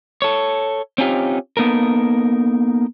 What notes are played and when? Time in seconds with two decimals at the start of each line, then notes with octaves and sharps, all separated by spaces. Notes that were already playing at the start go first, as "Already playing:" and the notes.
0.22 A4 C#5
0.98 C4 C#4 D#4 F4 G4
1.57 A#3 B3 D#4 A4 A#4